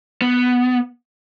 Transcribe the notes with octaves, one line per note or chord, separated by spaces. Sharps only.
B3